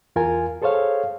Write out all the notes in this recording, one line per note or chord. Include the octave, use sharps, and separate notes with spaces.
E2 F4 A#4 G#5
G#4 A4 C5 C#5 F5